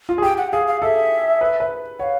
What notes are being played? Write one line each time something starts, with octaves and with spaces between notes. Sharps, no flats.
F4
G#4
G4 G5
F#5
G#4 F5
F5
A4 E5
B4
B4
C#5 F5 F#5